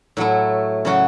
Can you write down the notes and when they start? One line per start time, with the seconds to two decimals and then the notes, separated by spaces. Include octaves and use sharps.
0.17 A2 F#3 A3 E4
0.85 C#3 F#3 C#4 F#4